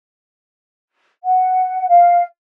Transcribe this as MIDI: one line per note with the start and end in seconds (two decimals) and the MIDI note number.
1.24 1.87 78
1.89 2.24 77